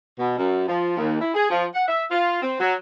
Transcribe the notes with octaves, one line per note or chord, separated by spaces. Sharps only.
B2
F#2
F3
D#2
E4
G#4
F3
F#5
E5
F4
C4
F#3